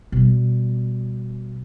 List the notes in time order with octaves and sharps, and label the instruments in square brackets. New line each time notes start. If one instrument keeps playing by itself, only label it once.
[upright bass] B2 G3